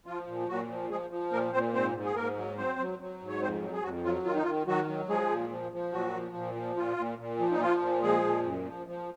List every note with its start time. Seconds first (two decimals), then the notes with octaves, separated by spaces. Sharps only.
0.06 F3 F4
0.27 A#2
0.48 A#2 F#3 F#4
0.69 F3
0.90 F3 G#3 G#4
1.10 F3
1.32 A#2 A#3 A#4
1.53 A#2 C4 C5
1.73 G#2 C4 C5
1.94 G#2
2.05 G#4
2.16 G#2 A#3 A#4
2.37 F#3
2.58 F#3 C4 C5
2.79 F#3
2.99 F#3
3.20 G#2
3.28 C#5
3.41 F2 C4 C5
3.62 F#3
3.73 G#4
3.83 F2 F#3 F#4
4.04 F#3 F4
4.25 D#3 F4
4.34 D#4
4.43 F4
4.46 D#3
4.67 D#3 F#3 F#4
4.87 F#3
5.08 F3 G#3 G#4
5.30 A#2
5.50 F3
5.72 F3
5.92 A#2 F#3 F#4
6.13 F3
6.35 A#2
6.56 F3
6.77 A#2 F4
6.97 A#2
7.19 A#2
7.39 F3
7.51 D#4
7.60 F3 F4
7.81 A#2
8.02 F3 G#3 G#4
8.23 A#2
8.44 F#2
8.65 F3
8.87 F3